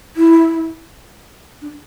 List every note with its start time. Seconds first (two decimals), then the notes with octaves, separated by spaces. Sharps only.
0.16 E4
1.61 D4